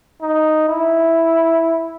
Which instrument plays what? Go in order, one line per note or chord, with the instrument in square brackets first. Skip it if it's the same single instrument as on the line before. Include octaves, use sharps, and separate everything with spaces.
[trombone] D#4
E4